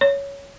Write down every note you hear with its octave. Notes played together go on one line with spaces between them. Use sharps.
C#5